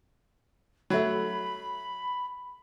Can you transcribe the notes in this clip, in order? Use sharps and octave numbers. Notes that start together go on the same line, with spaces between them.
F#3 A3 B5